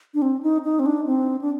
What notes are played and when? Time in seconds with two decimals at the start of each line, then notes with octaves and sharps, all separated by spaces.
0.14 D4
0.22 C4
0.43 D#4
0.64 D#4
0.79 C4
0.86 D4
1.06 C4
1.42 D4